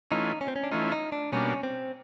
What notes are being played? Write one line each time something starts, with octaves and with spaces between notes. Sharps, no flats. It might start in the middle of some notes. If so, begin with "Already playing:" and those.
E3 A3 C#4 D#4 F4
C#4
C4
C#4
D4
E3 A3 C#4 D#4 F4
D#4
D4
B2 G3 A#3 C#4 D4
C4